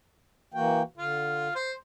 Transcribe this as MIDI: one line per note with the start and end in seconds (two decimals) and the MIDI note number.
0.54 0.83 52
0.54 0.83 58
0.54 0.82 66
0.54 0.83 79
0.97 1.48 50
0.97 1.52 65
1.55 1.72 72